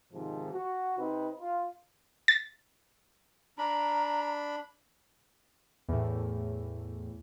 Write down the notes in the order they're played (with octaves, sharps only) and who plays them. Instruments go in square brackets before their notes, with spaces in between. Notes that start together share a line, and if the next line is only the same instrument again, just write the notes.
[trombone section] G#2 C3 D#3 F3
F#4
C3 C4 D#4 B4
F4
[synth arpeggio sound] A6
[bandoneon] D4 B5 [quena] A#5
[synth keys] E2 A2